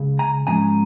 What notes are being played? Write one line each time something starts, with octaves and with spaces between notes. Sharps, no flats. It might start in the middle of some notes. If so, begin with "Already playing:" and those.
Already playing: C#2 C#3
G#5 A#5
G#2 F3 G#3 C#4 G#5 A#5